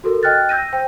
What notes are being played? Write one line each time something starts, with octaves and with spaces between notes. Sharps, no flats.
F#4 A4 A#4
D#5 G5 F6 F#6 A6
E6 G6 A#6 D#7
C5 G5